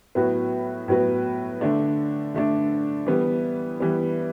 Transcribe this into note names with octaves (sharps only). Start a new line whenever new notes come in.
A2 F#3 B3 F#4 B4
A2 F#3 B3 F#4 B4
D3 A3 D4
D3 A3 D4
E3 G3 B3
E3 G3 B3